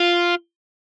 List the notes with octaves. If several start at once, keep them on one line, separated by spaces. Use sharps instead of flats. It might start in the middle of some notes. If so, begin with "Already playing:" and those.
Already playing: F4